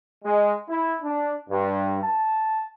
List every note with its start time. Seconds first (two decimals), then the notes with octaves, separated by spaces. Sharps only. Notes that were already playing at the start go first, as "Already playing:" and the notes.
0.24 G#3
0.69 E4
1.02 D4
1.50 G2
2.02 A5